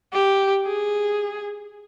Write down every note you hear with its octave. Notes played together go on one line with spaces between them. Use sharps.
G4
G#4